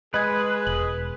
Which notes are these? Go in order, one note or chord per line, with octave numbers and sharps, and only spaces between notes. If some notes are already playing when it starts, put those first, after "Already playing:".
G#3 G#4 B4 D#5 G#6
E1 F#7